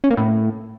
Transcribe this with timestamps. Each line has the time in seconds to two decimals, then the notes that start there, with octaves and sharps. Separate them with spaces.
0.04 C#4
0.11 A#3
0.17 A2